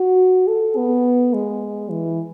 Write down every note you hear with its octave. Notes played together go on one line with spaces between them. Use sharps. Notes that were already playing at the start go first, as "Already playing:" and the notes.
Already playing: F#4
A4
B3
G#3
E3